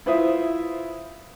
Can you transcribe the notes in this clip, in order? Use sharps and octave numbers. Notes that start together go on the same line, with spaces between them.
E4 F4 B4 C5 E5 D#6